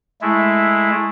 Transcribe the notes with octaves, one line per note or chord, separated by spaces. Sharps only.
G#3 A3 E4